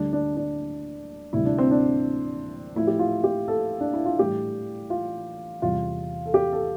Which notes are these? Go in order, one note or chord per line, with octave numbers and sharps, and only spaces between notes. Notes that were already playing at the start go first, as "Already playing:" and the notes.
Already playing: D2 D3 G3 D4
D4
D4
D2 C3 E3 G3 E4
D4
C4
D4
A2 F3 E4
G4
F4
G4
A4
D4
E4
F4
A2 E3 G3 G4
F4
E2 C3 G3 F4
A4
G4
A4